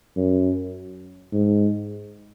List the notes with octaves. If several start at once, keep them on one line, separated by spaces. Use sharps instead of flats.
F#2
G#2